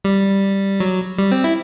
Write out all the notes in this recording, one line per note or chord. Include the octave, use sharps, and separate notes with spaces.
G3
F#3
G3
C4
E4